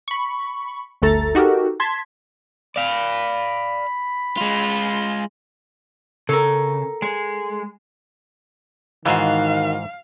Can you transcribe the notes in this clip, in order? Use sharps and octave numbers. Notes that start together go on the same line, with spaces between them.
B5 C#6
G1 D2 A3 A4 A#5 A6
D#4 F#4 G4 A4 A#4
A5 C6 G#6 B6
D5 F5 B5
G#3 F4
C#3 A4 A#4
G#3
G#2 D#3 E3 F4 F#4 F5